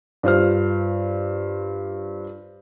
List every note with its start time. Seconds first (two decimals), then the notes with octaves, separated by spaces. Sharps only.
0.23 G2 F4 C5 F6